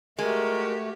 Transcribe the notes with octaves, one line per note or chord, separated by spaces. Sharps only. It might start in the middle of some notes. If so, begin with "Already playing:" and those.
G#3 A3 F#4 G4 A#4